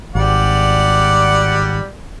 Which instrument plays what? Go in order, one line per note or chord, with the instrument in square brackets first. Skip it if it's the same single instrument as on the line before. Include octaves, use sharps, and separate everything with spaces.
[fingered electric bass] G#1 [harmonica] G3 D5 F#5